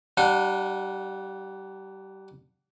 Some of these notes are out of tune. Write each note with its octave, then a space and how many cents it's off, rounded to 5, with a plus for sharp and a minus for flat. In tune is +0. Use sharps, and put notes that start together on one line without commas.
G3 -25 D4 +25 F#5 -30